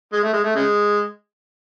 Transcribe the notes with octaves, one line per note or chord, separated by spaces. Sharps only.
G#3
A3
G#3
A3
C#3 G#3